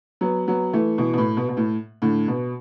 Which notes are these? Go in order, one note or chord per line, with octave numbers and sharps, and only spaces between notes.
F#3 B3
F#3 B3
E3 A3
B2 E3
B2
A2
B2
B2
A2
A2 D3
B2